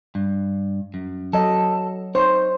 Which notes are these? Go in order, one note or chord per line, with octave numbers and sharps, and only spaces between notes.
G2
F#2
F#3 A4 D#5
D#4 C5 C#5